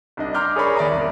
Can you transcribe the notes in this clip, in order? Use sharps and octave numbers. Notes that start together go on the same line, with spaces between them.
C2 D4 D#5
A#5 C6 D6 F6 G6
G#4 A#4 C#5 D5 B5 C#6
D#2 D5 E5 A#5 D#6
E1 C2